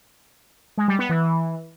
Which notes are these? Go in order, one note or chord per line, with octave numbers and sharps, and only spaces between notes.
G#3
G3
B3
E3